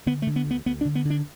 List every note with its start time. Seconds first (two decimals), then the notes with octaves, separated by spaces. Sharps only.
0.06 D3 B3
0.22 A3
0.27 D3
0.36 B3
0.46 D2 B3
0.66 D2 B3
0.81 D4
0.85 D3
0.95 B3
1.05 D3
1.10 D4